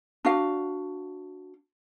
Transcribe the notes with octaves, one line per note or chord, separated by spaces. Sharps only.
D4 F#4 F5